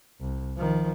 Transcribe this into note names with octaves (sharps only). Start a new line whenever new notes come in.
C2
D#3 F3